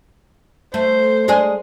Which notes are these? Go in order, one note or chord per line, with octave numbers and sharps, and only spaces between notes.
A3 C5
G#3 D4 G#4